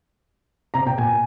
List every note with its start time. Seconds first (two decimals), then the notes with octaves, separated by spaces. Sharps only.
0.74 C3 A#5
0.87 B2 G5
0.98 A#2 G#5